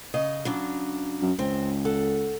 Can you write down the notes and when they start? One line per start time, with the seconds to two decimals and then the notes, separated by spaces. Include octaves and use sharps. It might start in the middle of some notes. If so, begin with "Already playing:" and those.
0.14 C#3 D#5
0.45 C#3 F#3 D4
1.22 F#2
1.39 C#2 C4
1.85 A4 F#5